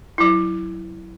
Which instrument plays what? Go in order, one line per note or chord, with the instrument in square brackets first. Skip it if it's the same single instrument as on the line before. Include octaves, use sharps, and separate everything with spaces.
[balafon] F#3 E4